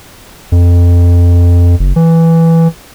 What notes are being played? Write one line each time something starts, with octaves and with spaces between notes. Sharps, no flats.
F2
F#1
E3